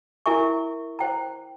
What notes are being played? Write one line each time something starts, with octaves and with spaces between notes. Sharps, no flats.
E4 A#4 E5 G#5 C#6
C5 G5 A#5